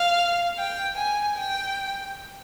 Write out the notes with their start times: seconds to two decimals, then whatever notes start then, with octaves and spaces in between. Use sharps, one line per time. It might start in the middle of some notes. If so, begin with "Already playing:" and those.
Already playing: F5
0.59 G5
0.98 G#5
1.37 G5